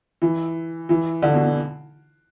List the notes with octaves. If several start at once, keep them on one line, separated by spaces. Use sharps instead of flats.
E3
E3
D3
B2
B2